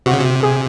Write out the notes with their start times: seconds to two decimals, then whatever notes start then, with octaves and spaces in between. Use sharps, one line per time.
0.06 C3 F#4
0.13 C#3
0.20 C3
0.43 G#4